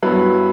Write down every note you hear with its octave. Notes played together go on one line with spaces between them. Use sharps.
G2 F#3 B3 E4 B4